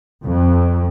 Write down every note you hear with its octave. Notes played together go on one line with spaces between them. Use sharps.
F2